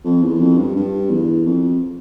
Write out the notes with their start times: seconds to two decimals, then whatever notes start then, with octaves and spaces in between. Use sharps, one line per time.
0.04 F2
0.23 E2
0.40 F2
0.57 G2
0.76 G2
1.10 E2
1.46 F2